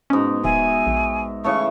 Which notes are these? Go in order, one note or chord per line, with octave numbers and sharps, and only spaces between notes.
G#2 B2 C#4
D1 E5 G#5
A#1
C#3 E3 A3 C#6